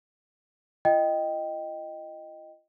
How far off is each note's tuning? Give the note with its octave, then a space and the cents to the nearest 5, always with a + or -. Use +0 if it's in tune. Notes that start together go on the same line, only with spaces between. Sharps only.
F4 -45 D#5 +0 G5 +0